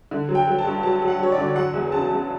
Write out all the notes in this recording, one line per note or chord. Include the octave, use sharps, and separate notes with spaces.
D3
F#3
G5
F#3
A5
G2
F#3 A5
F#3
F#5
F#3 C#5
D5
D3
F#3 F#5
E2
C#3 A5
E2